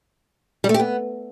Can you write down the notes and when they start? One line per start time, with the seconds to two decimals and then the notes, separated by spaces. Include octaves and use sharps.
0.64 G3
0.69 A3
0.74 G4
0.80 B3